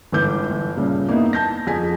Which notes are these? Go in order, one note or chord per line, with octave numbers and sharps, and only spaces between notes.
G1 G#2 E3 B4 D6 G6
G1
G2 A#2 C#3
A#3 B3 D#4 E4
A5 G6 A#6
F2 G#4 G#5 B6